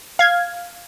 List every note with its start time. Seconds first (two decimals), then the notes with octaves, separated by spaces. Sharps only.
0.19 F5 G#6